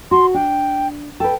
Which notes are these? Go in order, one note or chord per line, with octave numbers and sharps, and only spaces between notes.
F#4 C6
D4 G5
A4 B4 G5